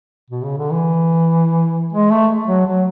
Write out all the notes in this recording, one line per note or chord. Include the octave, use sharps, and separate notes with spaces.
B2
C#3
D3
E3
G#3
A3
F#3
F#3